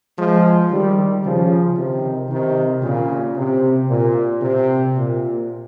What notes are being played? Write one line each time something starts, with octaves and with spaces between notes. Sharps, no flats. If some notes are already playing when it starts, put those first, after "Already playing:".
F3 G#3
D#3 G3
C#3 F3
C3 D#3
C3 D#3
A#2 C#3
C3
A#2
C3
A#2